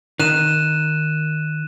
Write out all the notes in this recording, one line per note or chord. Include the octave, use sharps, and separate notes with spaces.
D#3 F#6 D#7 E7